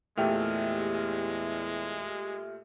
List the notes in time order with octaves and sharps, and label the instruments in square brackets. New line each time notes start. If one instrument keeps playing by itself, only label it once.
[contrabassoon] E2 [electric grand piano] A#2 A3 [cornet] G#3 [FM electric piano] G4 E5 F6